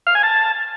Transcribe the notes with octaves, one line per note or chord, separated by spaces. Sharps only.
F5
G#5
A5